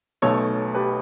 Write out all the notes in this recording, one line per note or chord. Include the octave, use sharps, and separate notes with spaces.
B1 B2 A3 A4 C#5
G4 B4